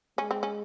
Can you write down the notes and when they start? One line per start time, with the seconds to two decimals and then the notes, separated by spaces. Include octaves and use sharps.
0.18 G#3 C#4
0.31 C4
0.43 C#4